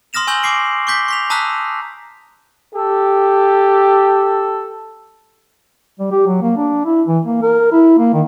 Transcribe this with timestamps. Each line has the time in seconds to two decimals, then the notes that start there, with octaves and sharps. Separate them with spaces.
0.13 C6 D#6 F6 A#6 E7 F7
0.27 G#5 C#6 E6 G6 F#7
0.43 G#5 D6 C7 D7
0.87 C#6 D6 G6 B6
1.08 C#6 B6 F7
1.30 A5 A#5 D#6 E6 F#6 B6
2.75 G4 A4
5.99 G3
6.12 G4
6.26 F#3
6.41 A#3
6.57 D4
6.85 E4
7.07 E3
7.25 A#3
7.42 A#4
7.72 E4
7.98 A#3
8.14 D#3